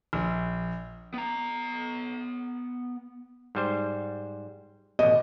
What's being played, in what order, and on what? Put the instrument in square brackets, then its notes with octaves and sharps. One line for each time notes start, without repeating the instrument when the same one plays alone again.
[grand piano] A#1
[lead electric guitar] B3 A#5
[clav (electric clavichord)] G#2 G3 C5
[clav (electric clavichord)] A1 B2 [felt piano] D#5